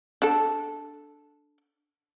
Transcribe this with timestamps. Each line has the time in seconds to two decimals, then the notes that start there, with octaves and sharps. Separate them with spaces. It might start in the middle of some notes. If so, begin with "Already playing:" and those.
0.22 D4 A4